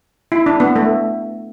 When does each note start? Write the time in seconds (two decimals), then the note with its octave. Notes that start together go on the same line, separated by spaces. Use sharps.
0.32 E4
0.46 D4
0.60 B3
0.76 A3